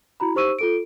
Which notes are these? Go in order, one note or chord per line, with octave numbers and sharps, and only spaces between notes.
E4 F#4 A#5 B5
D#4 G4 C5 C#6 E6 D#7
F4 A4 D7